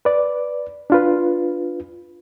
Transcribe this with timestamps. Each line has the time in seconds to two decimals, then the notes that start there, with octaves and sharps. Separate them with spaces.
0.05 B4 D5
0.90 D4 F4 B4